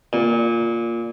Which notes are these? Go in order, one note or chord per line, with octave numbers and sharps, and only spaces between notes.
A#2